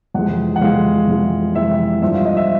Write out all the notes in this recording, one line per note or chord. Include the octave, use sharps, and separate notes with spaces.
F2 C3 E3 G#3 F#5
F#5
F2 C3 E3 G#3 F5
F2 C3 E3 G#3
F2 C3 E3 G#3 E5
G2 D3 F3 E5
F5
D#5
E5